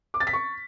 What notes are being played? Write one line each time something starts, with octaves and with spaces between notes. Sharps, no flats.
D6
A6
B6
C#6